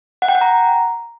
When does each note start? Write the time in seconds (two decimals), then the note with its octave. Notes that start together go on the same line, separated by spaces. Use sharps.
0.22 F#5
0.29 G5
0.35 F#5
0.41 A#5